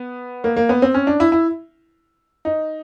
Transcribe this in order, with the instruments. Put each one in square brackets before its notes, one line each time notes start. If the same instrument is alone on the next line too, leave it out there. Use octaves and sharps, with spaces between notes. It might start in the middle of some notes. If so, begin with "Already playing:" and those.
Already playing: [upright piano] B3
A#3
A#3
B3
C4
C#4
D4
E4
E4
D#4